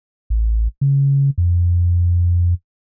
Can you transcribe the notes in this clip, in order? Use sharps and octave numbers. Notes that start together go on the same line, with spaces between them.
A1
C#3
F2